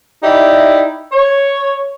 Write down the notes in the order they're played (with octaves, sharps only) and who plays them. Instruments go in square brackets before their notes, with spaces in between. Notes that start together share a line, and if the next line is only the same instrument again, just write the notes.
[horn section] D#4 E4 G4 D5 E5
C#5